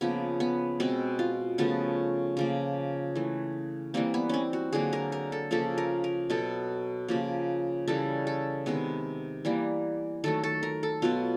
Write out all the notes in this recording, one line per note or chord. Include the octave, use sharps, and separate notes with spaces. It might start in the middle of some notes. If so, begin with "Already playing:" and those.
C#3 F3 A#3 B3
B3
B2 G#3 B3 C4
F4
C#3 F3 A3 B3
C#3 F3 A#3
E3 A3
E3 G3 A#3 C4
B3
C4 C#4
F#4
D3 F#3 A#3 G#4
A#4
A#4
A4
C#3 F3 A#3 A4
A#4
A#4
B2 F#3 B3 A4
C#3 F3 A#3
C#3 E3 G3 A4
A4
C3 D#3 G#3 B3
E3 G3 A#3
D#3 F#3 A3 A4
A4
A#4
A4
B2 F#3 B3 F4